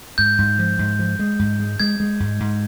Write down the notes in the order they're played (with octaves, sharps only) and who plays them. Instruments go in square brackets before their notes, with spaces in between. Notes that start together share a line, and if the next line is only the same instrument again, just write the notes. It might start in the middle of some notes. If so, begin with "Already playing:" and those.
[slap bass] G#2 [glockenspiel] G6
[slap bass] G#2
F3
G#2
F3
G#3
G#2
G#3
[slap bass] G#3 [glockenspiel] G#6
[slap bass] G#3
G#2
G#2